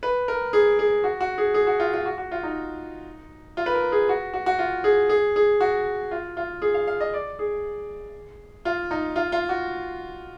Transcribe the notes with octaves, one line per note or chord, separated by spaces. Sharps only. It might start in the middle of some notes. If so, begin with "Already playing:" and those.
B4
A#4
G#4
G#4
F#4
F#4
G#4
G#4
F#4
F4
F4
F#4
F#4
F4
D#4
F4
B4
A#4
G#4
F#4
F#4
F#4
F4
G#4
G#4
G#4
F#4
F4
F4
G#4
F5
F5
D#5
D5
G#4
F4
D#4
F4
F4
F#4